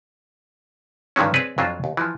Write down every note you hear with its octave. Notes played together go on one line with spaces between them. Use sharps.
G2 D3 D#3 F3 F#3 C#4
C4 G#4 B4 C#5 D5
F2 F#3 D4 F4 C5
D#2
E3 F3